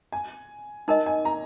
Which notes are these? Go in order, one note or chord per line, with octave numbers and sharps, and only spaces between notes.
G#5
D#4 A#4 D#5 G#5
G#5
A#5